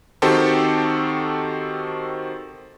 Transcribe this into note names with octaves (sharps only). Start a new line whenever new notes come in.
D#3 C4 F#4 G4 A4 C5